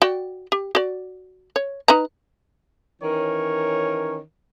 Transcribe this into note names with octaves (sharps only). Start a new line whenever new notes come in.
F#4 D5 G5
G4
F#4 D5
C#5
D#4 B4 A#5
D#3 E3 C#4 A#4 C#5